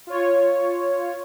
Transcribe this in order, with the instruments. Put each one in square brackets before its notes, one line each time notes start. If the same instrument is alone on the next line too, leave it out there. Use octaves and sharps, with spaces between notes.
[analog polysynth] F4 C#5